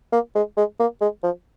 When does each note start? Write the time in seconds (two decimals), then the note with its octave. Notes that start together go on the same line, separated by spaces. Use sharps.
0.13 A#3
0.35 G#3
0.57 G#3
0.80 A#3
1.01 G#3
1.23 F3